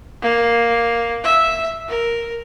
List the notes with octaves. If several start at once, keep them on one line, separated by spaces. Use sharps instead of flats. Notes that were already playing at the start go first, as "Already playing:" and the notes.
A#3
E5
A#4